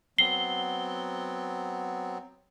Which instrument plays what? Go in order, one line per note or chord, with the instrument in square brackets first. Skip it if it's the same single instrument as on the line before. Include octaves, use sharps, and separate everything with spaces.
[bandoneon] F#3 B3 C4 [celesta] C7 [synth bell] G7